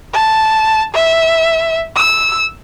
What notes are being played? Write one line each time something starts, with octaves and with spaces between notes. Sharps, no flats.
A5
E5
E6